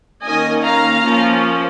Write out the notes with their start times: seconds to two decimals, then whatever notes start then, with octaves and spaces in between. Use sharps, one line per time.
0.24 D#3 A#3 C#4 D#5 G#5
0.64 F5 A#5
1.04 F3 A#3 C#4